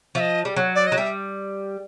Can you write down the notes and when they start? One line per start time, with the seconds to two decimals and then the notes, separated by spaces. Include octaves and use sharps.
0.15 F3 E5
0.20 D#5
0.45 G3
0.56 F#3
0.75 D5
0.87 F#3 D#5
0.97 G3 E5